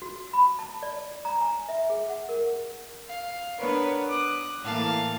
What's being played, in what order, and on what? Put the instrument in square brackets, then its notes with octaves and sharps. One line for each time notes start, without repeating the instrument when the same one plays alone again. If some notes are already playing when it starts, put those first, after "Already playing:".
[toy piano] F#4
B5
A5
D5
A#5
G#5
E5
G#4
F#5
A#4
[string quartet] F5
B3 D4 A#4 B4 C#5
D6 D#6 F#6
A2 E3 A#3 F5 A5